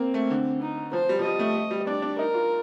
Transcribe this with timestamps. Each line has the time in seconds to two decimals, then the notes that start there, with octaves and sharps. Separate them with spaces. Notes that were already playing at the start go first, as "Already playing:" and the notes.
Already playing: A#3 C4
0.14 A3
0.31 D3
0.62 D#4
0.93 F3 C5
1.09 G3
1.19 F3
1.25 G3 D#5
1.39 A3
1.55 A3
1.71 G3
1.87 D4 D5
2.02 D4
2.18 D#4 A#4
2.34 F4